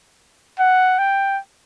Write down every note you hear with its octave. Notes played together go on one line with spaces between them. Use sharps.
F#5
G5